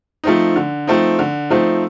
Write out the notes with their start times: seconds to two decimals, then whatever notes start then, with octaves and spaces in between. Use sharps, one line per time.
0.24 F3 A3 C4 D#4
0.56 D3
0.87 F3 A3 C4 D#4
1.19 D3
1.50 F3 A3 C4 D#4